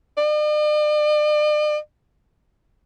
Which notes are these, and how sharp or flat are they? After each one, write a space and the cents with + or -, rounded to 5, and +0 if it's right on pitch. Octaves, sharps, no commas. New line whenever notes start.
D5 +45